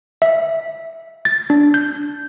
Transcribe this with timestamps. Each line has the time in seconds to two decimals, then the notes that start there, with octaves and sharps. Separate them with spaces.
0.22 E5
1.25 A6
1.50 D4
1.74 G6